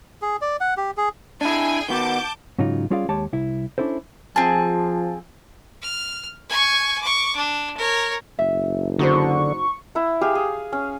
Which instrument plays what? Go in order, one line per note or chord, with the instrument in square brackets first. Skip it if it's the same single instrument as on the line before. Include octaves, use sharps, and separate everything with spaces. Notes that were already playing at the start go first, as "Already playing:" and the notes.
[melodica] G#4
D5
F#5
G4
G#4
[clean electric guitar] D4 E4 [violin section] G#4 G5 G#5
[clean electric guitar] D#3 B3 F#4 [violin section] A5 D6 G6
[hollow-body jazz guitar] G#2 C#3 F#3 D#4 F4
G3 C#4 F4 G#4 D5 F5
D#2 G#3 G4 C#5 A5
C2 E4
C#4 D4 E4 A4 C5
[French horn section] F3 [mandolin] C4 G#4 [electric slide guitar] A5
[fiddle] F6
G#5 C#6
C#6 D6
D4
A#4 C#5
[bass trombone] F#1 [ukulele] E5
[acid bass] D3 [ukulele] D#4 F#4 C5 [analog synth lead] C#6
[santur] E4 F#5
G4 G#4 F5
G#4
C#4